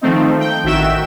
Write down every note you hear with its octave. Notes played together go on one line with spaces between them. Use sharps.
D#3 F3 A3 C4 D#4
G5
A1 D#3 F#4 E5 G5 E7